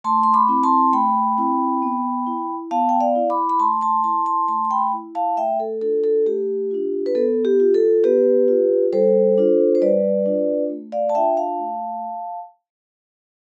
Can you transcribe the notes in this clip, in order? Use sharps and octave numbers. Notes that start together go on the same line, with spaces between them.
A3 A5 C6
C6
B5 D6
C4 E4
A5 C6
A3 G5 B5
C4 E4
B3
E4
B3 F5 A5
G5
D5 F5
E4
B5 D6
B5
A3 A5 C6
A5 C6
E4 A5 C6
A5 C6
A3 A5 C6
C6
G5 B5
E4
F5 A5
A3 E5 G5
A4
D4 F4 A4
A4
A3 G4
D4 F4
B4
B3 A4
G4
F4
A4
B3 G4 B4
F4
G3 A4 C5
D4 F4
C5
G3 B4 D5
D4 F4
A3
D5 F5
A5
D4 F4 E5 G5
F5 A5
A3